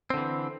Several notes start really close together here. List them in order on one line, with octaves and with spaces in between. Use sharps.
C4 D3 E3